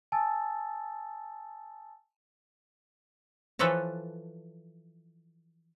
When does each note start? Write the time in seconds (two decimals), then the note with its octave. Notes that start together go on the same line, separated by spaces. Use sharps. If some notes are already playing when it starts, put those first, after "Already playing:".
0.12 G#5 A5 D#6 E6 A6
3.59 E3 F3 A4 B4 C#5 A#5